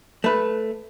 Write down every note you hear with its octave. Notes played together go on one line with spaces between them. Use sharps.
A3 B4